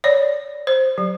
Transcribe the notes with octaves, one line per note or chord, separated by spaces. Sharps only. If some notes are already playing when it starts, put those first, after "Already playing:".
C#5 D5
C5
F#3